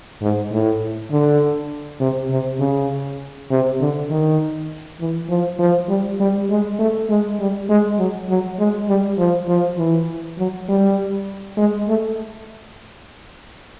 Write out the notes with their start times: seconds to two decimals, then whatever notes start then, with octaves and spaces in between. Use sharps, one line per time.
0.21 G#2
0.52 A2
1.11 D3
2.01 C3
2.30 C3
2.60 C#3
3.51 C3
3.80 D3
4.10 D#3
5.00 E3
5.29 F3
5.59 F3
5.89 G3
6.20 G3
6.50 G#3
6.79 A3
7.10 G#3
7.40 G3
7.70 G#3
7.99 F#3
8.29 F#3
8.59 G#3
8.89 G3
9.18 F3
9.48 F3
9.78 E3
10.38 F#3
10.69 G3
11.57 G#3
11.88 A3